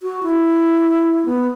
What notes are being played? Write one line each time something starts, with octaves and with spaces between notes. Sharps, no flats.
F#4
E4
B3